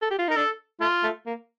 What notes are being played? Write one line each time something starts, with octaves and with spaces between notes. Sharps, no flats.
A4
G4
F4
D#4 A#4
D4 A4
A3 F4
A3
A#3